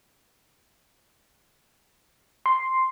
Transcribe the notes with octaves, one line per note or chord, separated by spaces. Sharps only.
C6